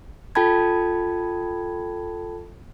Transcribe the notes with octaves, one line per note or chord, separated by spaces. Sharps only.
F4 A4 G5 A5 B5 G#6